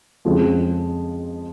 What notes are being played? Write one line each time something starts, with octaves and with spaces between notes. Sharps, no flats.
F2 C#3 F3 G#3 C4